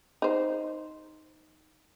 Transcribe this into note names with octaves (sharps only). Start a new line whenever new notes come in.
D#4 C5